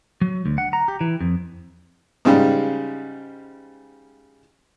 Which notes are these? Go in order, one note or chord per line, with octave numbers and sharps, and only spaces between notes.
F#3
D2
F#5
A#5
G4
E3
F2
G#2 C#3 G3